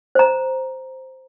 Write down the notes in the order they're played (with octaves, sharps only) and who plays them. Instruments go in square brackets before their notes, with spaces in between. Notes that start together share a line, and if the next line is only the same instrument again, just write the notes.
[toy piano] C5 A#5